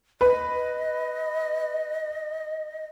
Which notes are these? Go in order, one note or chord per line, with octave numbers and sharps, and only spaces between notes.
B4 D#5